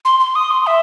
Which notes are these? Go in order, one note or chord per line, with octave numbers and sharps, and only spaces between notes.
C6
C6
D#6
C6
E5